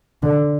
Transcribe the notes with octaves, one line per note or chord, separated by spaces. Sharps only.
D3